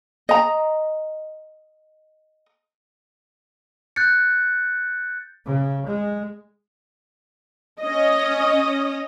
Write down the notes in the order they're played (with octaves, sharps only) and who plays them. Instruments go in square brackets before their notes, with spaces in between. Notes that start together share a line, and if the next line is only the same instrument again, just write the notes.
[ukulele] D#5 A#5
[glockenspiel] F#6 G6 A6 C#7
[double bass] C#3
G#3
[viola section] C#4 D#5